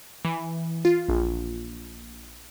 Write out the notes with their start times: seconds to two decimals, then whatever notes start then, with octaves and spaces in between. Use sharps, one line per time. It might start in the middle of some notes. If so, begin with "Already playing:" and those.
0.25 E3
0.85 F4
1.09 A#1